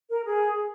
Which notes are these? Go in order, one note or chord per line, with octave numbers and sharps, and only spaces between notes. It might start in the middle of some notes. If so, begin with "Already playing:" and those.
A#4
G#4